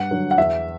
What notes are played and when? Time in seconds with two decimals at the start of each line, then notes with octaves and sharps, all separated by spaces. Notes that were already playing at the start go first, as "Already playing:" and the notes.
Already playing: G2 F#5
0.11 D3 F#3
0.31 F#5
0.38 E2 E5